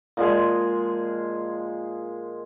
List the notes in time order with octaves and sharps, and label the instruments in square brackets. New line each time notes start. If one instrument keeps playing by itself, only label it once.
[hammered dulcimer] A#2 F3 G#3 G#4